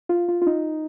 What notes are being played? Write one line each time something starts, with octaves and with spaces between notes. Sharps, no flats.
F4
F4
F4
D#4